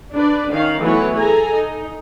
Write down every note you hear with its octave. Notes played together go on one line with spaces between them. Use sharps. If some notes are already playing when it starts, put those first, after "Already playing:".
D4 B4 D5
D#3 C#4 F5
E3 F#3 A3 B3 B4 C#5
G#4 A4 G#5 A#5
D#4